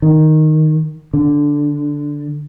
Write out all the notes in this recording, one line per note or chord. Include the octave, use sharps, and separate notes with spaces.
D#3
D3